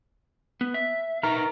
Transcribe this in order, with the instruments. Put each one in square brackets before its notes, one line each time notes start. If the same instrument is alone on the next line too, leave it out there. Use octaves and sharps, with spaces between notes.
[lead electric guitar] B3
E5
[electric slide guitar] D#4 B4 A#5 [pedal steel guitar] A#4